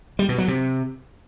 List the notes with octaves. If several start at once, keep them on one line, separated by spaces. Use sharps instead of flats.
G3
B2
F#3
C3